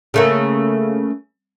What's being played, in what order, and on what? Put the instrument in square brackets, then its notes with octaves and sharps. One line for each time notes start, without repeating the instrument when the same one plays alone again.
[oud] C#3 A3 A#3